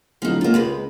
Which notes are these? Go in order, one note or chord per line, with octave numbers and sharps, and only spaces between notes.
D1 F3 D#4
C#2 A#3 F4
C3 G#3 B4